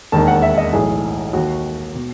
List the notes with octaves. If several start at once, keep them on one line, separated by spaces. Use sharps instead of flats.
E1 D#2 D#3 A5
F#5
E5
D#5
B1 A2 E3 G#4
D#2 D#3 F#4
B2